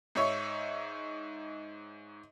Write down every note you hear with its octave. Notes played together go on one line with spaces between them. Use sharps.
G#2 D#4 C#5 E5 C#6